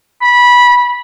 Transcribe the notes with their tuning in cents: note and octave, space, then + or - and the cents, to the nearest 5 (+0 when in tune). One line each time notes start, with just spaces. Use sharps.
B5 -15